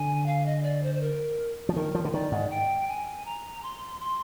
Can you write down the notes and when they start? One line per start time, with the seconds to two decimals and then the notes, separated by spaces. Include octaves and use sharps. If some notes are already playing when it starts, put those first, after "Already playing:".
Already playing: D3 G#5
0.26 F5
0.46 D#5
0.63 D5
0.83 C5
0.95 C5
1.01 A#4
1.69 F3
1.75 D#3 A#4
1.95 F3
2.05 D3
2.13 D#3 D5
2.32 G#2
2.50 G5
2.88 G#5
3.25 A#5
3.63 C6
4.00 C6